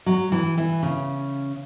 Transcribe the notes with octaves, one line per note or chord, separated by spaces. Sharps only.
F#3
E3
E3
C#3